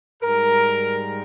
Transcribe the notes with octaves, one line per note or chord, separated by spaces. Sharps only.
G#2 G3 A#4